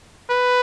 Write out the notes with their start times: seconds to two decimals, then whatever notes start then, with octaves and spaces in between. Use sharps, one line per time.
0.31 B4